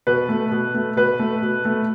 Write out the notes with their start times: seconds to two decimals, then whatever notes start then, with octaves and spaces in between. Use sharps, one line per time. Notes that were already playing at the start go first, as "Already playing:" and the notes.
0.07 B2 B4
0.29 A3
0.52 B2
0.74 A3
0.96 B2 B4
1.19 A3
1.42 B2
1.65 A3